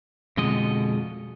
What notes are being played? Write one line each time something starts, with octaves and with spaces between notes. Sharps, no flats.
F2 B2 D3 G#3 D#5